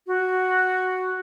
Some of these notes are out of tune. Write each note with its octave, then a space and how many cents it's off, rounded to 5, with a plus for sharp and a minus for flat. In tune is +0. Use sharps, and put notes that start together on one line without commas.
F#4 +0